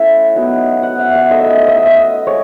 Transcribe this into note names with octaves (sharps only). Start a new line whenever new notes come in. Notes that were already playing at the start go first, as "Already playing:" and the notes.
Already playing: A3 C#4 E4 E5 F#5
F#3 B3 D#4
F#5
E5
E5
A3 D#4 D#5
E5
D#5
E5
D#5
E5
D#5
G#3 C#5